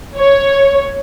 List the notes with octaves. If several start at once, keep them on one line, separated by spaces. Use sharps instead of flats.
C#5